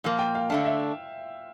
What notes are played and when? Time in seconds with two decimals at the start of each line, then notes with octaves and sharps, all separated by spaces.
0.04 A#2 F3 A#3 F5
0.19 G5
0.35 F5
0.50 D3 A3 D4 F5
0.65 E5